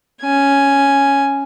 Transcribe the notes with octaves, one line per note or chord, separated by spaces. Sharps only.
C#4 G#5